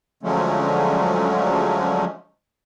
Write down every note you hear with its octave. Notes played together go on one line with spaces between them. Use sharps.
D3 F3 F#3 G#3 A3 C#4